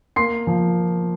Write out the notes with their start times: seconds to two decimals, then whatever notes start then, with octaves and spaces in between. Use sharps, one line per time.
0.16 A#3 C6 C7
0.47 F3